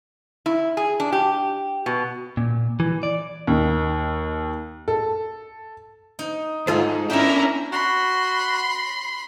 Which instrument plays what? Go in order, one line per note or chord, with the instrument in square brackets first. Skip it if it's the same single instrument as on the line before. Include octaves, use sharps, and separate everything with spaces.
[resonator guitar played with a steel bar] E4
G#4
D4
G4
B2
[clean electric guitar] A#2
E3
D5
[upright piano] D#2
A4
[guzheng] D#4
[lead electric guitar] C#2 G#2 [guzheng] D#4 G#5 [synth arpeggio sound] F4 A4 C5
[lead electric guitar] C#4 D4 [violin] E4 A#4 [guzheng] E5 G5
[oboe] F#4 [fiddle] B5 C6